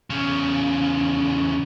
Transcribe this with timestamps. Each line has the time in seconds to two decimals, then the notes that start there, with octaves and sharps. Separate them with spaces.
0.10 E2 C#3